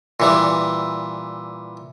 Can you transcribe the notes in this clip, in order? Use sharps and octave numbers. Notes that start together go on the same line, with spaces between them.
A#2 E3 G3